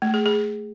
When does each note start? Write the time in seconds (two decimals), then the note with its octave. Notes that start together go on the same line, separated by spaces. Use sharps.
0.02 A3
0.14 G#4
0.26 G#4